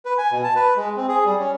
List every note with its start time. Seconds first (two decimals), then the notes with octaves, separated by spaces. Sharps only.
0.05 B4
0.18 G#5
0.32 B2
0.44 A5
0.56 B4
0.76 G#3
0.97 C4
1.08 G#4
1.25 G3
1.40 C#4